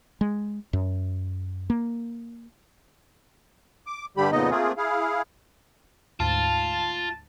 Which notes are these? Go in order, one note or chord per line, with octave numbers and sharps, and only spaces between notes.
G#3
F#2
A#3
D6
G2 D3 G3 G4 B5
F2 A#2 C#3 B3 D#4 D#5
A3 A#3 C4 F4 G#4
E4 G#4 F5
D2 G#2 F4 A5